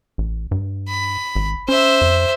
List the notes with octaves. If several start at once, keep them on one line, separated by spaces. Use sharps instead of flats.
A1
G2
B5
G#1
C#4 C5 E5
F2